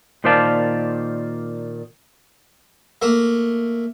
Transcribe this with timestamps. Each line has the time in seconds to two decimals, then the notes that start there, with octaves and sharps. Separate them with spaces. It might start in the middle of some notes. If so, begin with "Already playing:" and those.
0.24 A#2 D#3 C5 D5 F5 A5
3.02 A3 A#3